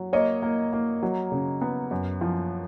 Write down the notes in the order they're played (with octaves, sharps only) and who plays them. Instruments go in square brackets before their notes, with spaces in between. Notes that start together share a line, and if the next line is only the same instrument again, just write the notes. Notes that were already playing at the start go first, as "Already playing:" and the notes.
Already playing: [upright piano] F#3
A#3 C#5 D#5
A#3
A#3
F#3
C#3
B3
F#2
F3